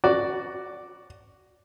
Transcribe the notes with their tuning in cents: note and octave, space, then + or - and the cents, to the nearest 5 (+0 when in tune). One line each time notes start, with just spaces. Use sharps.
F#4 +10 D5 +0